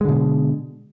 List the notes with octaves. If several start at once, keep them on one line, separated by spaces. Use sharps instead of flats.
B2 D3 G#3